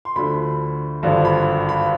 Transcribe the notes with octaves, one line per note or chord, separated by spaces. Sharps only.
C6
D2 D3 F3 B5
G#1 G2 D3 F3
B5
B5